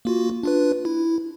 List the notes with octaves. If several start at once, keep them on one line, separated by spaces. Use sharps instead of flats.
A#3 F4 F#4
D4 F4 B4
E4